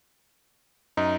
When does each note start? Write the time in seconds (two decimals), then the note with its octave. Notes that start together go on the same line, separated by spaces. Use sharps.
0.97 F#2 D#4